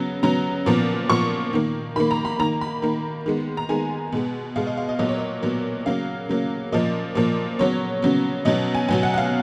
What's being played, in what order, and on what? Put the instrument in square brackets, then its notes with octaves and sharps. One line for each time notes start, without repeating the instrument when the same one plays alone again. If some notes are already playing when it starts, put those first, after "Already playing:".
Already playing: [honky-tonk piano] C#3 F#3 B3
C#3 F#3 B3 A#5
A#2 F3 B3
A#2 F3 B3 C#6
D#3 A#3
D#3 A#3 B5
A#5
B5
D#3 A#3 A#5
B5
D#3 A#3
D#3 G#3 B3
A#5
D#3 G#3 B3 G#5
B2 G#3 B3
B2 G#3 B3 F5
D#5
F5
D#5
A#2 F#3 B3 D#5
C#5
D#5
A#2 F#3 B3
C#3 F#3 A#3 F5
C#3 F#3 A#3
A#2 F3 A#3 D#5
A#2 F3 A#3
C#3 F#3 B3 C#5
C#3 F#3 B3
B2 F#3 B3 D#5
G#5
B2 F#3 B3 G#5
F#5
F#5
F5